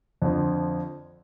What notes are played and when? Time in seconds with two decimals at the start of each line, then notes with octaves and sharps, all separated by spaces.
0.22 F2 D3 F3